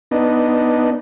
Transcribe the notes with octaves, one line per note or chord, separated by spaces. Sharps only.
B3 D4 D#4